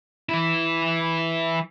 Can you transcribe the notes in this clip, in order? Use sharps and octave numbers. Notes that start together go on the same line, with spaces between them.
E3 E4